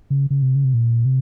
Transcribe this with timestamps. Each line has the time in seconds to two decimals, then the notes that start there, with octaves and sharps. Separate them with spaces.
0.10 C#3
0.30 C#3
0.42 C3
0.55 C#3
0.64 C3
0.74 A#2
1.05 C3